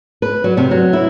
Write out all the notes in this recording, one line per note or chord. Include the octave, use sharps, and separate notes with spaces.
B4
F#3
C3
F#3
E4